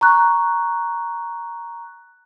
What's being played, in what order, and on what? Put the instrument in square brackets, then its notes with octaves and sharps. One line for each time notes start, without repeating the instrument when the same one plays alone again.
[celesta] A#5 C#6 F#6